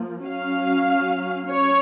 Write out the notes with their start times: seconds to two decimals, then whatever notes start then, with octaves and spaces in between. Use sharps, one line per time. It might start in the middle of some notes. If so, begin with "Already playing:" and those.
Already playing: F3 A#3
0.26 F#3 C#4 F5
1.50 C#4 C#5